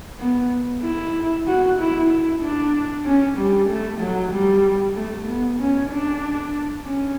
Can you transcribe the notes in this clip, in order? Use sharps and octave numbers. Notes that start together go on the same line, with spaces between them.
B3
E4
F#4
E4
E4
D4
C#4
G3
A3
F#3
G3
A3
B3
C#4
D4
C#4